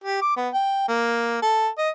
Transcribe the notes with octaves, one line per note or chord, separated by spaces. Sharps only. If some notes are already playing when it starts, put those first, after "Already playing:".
G4
D6
B3
G5
A#3
A4
D#5